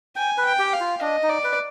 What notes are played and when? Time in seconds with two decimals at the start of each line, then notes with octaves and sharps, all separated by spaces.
0.16 G5 G#5
0.38 B4
0.45 G5
0.59 G4
0.73 F5
0.80 F4
1.02 D4 D#5
1.23 D#4
1.30 D5
1.44 B4